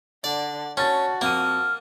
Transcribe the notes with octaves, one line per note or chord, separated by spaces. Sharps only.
D3 D5
C#4 F#4 A5 A6
F2 A#3 F6 D#7